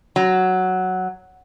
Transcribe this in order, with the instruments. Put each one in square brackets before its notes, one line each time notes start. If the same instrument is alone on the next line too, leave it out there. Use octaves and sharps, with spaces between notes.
[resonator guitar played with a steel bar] F#3